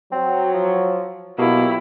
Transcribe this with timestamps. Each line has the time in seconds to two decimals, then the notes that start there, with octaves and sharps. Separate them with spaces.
0.12 F#3 C4
0.54 F3
1.39 B2 F#3 A#3 E4 F4 G4